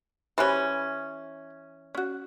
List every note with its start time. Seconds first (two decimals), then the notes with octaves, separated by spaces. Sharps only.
0.38 E3 C#4 G4 B4 C5
1.95 C#4 F#4